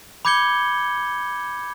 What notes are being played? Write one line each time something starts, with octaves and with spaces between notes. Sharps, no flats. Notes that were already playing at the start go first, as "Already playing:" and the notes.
B5 D6 G6 G#6 C#7 G7